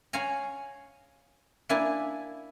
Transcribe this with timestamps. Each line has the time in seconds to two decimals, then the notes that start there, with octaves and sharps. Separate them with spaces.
0.13 C#5 F5 F#5 G#5 A#5
1.69 A#3 D4 E4 G#5